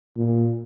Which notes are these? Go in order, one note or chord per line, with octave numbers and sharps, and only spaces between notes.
A#2